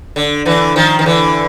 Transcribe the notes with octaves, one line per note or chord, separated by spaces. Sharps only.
D3
D3 E3
D#3 F3
D#3
D3 E3